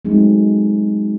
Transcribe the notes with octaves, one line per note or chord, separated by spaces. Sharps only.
F#3 G#3 A3 C4 D#4